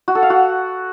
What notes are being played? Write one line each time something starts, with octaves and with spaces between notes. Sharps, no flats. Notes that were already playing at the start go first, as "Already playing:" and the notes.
F#4
A4
F5
F#4